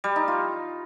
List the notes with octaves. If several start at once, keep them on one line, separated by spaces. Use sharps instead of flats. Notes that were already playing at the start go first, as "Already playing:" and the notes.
G3
D#4
F4